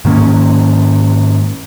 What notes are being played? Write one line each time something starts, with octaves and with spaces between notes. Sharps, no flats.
G#2 D#3 A#3 C#4